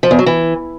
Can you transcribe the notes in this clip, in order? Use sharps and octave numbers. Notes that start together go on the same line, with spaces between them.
F3
E2
F#3
E3